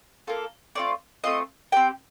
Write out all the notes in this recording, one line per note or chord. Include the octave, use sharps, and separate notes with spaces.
A#3 F4 A4
A3 C4 F4 D5
A3 C4 F4 D#5
C4 G4 G5